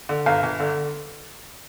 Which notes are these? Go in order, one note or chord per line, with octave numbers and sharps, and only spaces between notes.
D3
G1 F5
G1
D3